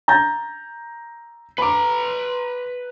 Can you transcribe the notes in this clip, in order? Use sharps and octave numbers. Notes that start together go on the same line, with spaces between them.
A#5 G6 A6
B4 A#5 B5 D6